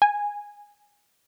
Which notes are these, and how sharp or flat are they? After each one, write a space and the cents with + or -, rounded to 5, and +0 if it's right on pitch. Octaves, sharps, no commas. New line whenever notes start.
G#5 -10